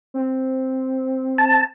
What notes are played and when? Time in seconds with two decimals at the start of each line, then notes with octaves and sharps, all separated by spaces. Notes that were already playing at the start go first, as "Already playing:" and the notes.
0.14 C4
1.38 A5